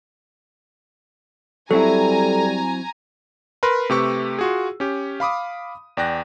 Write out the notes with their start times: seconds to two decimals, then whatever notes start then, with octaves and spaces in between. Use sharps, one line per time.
1.71 F#3 G3 C4 E4 A4 G#5 A#5
3.63 A#4 B4 B5 C6
3.90 C3 A3 G4 B4 C#6 E6
4.39 F4 F#4 G#4
4.80 C#4 G4
5.20 F5 B5 D6 D#6
5.97 E2 D5 G5 F#6 A#6